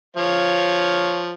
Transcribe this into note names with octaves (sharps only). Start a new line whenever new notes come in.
F3 C#5 F5